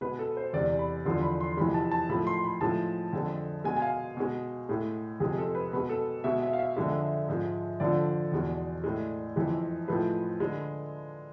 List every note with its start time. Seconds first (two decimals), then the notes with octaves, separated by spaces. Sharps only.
0.01 B2 G#3 B4
0.19 A4
0.37 C5
0.53 E2 C3 G#3 D5
0.79 B5
1.05 E2 D3 F3 G#3 C6
1.22 B5
1.41 C6
1.57 F2 C3 E3 G#3 B5
1.74 A5
1.91 A5
2.09 A2 F3 G#3 B5
2.27 C6
2.44 B5
2.61 A2 F3 G#3 A5
3.13 F2 D3 G#3
3.64 B2 G#3 G#5
3.77 G#5
3.82 F5
4.17 B2 G#3
4.69 A2 G#3
5.20 F2 C3 G#3 G#4
5.38 A4
5.55 B4
5.73 B2 G#3 B4
5.89 A4
6.24 B2 G#3 E5
6.42 E5
6.53 F5
6.59 E5
6.77 F2 D3 G#3
7.28 G#2 F3 G#3
7.80 F2 D3 F3 D5
8.32 E2 B2 G#3
8.84 A2 G#3
9.36 F2 E3 G#3
9.88 A2 F3 G#3 B4
10.40 D3 G#3